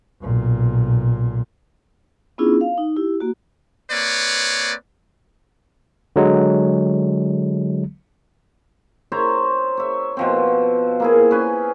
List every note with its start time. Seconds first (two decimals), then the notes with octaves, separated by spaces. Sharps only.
0.21 B1 A#2
2.38 B3 C#4 D4 E4 F4 G#4
2.61 F5
2.78 D#4
2.96 E4 G4
3.20 A#3 F#4
3.91 A#3 C4 B4 C#5 D5
6.16 D3 F#3 G#3
9.12 C5 C#5 E5 A#5
9.77 C#5 E5
10.17 B2 F3 C4
11.00 A#3 E4 G#4
11.31 C#4 B4 G#5